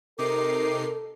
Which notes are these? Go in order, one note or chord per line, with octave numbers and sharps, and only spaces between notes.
C3 D#4 A4 A#4 D6 C7